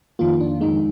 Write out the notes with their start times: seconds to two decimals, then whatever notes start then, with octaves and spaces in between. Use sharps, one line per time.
0.19 F2 D#3 A#3 F4
0.40 D4
0.61 F2 D#3 G#3 D#4